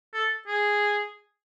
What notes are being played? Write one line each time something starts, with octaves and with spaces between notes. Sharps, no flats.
A4
G#4